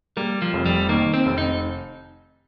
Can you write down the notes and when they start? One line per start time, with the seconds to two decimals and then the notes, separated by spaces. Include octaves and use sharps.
0.17 G3 A#3
0.42 F3
0.53 F1
0.66 G3
0.89 D#3 A#3
1.14 C4
1.26 F1
1.38 D#4